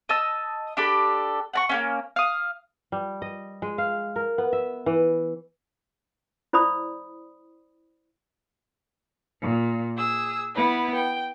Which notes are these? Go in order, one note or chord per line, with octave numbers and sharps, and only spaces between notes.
D#5 A5 E6
D4 G4 A4 B5
F#5 A#5 C#6
A#3 B3 C#4
F5 D#6
G3
D#5
G#3
F5
A#4
B3
E5
E3
E4 C5 D5 B5 D#6
A#2
G#4 E6
B3 E4 B4
G5